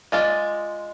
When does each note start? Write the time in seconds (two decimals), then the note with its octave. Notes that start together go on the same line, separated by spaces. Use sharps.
0.12 G#3 F4 D5